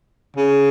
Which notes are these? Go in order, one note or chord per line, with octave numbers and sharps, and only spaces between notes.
C#3